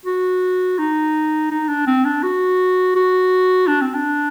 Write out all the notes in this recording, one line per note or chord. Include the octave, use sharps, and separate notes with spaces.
F#4
D#4
D#4
D4
C4
D4
F#4
F#4
D4
C4
D4